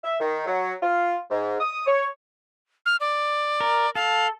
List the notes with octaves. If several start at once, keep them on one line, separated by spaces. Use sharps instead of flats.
E5
D#3
F#3
F4
G#2
D#6
C#5
F6
D5
A#4
A4 F5